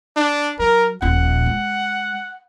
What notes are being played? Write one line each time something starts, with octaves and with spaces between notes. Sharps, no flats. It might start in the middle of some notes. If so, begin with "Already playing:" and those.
D4
F#3 A#4
D#1 A#1 F#5
G#3